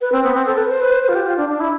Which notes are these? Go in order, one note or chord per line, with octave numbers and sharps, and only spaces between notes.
B4
C4
B3
C4
A4
B4
C5
B4
C5
B4
F4
G4
F4
D4
D4
E4